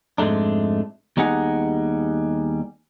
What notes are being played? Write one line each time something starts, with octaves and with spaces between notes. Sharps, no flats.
F2 G#2 G#3 A3 D4
D#2 G3 B3 D#4 G#4 F#5